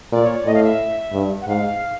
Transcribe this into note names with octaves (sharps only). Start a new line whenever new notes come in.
A#2 D5
C#5
D5
A2 D#5
F5
E5
G2
F#5
G#2 F5